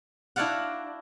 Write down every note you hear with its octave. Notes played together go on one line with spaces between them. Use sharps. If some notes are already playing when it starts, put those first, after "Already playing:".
D4 E4 F#4 D5 F5 F#5